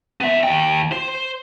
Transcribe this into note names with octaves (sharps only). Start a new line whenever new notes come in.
B3 E5
D#2 G5
C5